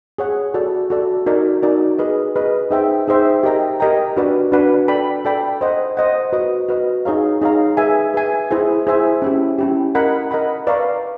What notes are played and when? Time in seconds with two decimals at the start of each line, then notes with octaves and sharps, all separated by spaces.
0.18 G#4 C#5 F#5
0.54 F#4 A4 D5
0.90 F#4 A4 D5
1.26 D#4 F#4 A#4 D5
1.62 D#4 F#4 A#4 D5
1.98 G#4 B4 D#5
2.36 G#4 B4 D#5
2.71 D#4 G#4 C5 E5 G5
3.07 D#4 G#4 C5 E5 G5
3.43 G4 A#4 D#5 G5 A#5
3.80 G4 A#4 D#5 G5 A#5
4.16 D4 F#4 B4 D5 F#5
4.52 D4 F#4 B4 D5 F#5
4.88 A4 D5 G5 B5
5.25 A4 D5 G5 B5
5.61 C5 D#5 F#5
5.97 C5 D#5 F#5
6.33 F#4 B4 D#5
6.69 F#4 B4 D#5
7.05 D#4 G#4 C#5 F5 A#5
7.42 D#4 G#4 C#5 F5 A#5
7.77 G#4 B4 E5 G#5
8.14 G#4 B4 E5 G#5
8.50 E4 G#4 C5 E5 G#5
8.87 E4 G#4 C5 E5 G#5
9.22 C#4 E4 G4
9.59 C#4 E4 G4
9.95 A#4 D#5 F#5 B5
10.31 A#4 D#5 F#5 B5
10.67 B4 D5 F5 A#5 C#6